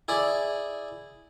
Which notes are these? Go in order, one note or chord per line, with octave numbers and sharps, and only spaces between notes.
E4 G#4 D5